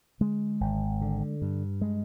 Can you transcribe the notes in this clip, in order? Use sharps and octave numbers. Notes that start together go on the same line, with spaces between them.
D3 G#3
G#1
D3
G2
G#3